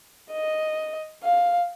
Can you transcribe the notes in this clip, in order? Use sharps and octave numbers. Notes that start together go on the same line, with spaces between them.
D#5
F5